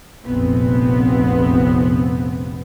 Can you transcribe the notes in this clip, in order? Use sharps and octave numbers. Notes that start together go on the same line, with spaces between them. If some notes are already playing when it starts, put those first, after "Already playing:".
F1 A#1 B3 C4